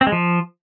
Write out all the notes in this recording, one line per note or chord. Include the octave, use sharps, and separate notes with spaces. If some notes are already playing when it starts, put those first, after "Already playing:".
C4
G#3
F3